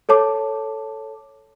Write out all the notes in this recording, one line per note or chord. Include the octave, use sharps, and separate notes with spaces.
A4 C#5 A5 D6